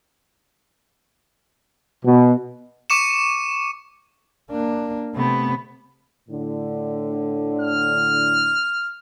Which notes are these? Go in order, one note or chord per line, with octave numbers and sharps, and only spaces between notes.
B2
C#6 D6 C#7 E7
A#3 D4
C3 A3 B3
A2 D3
F6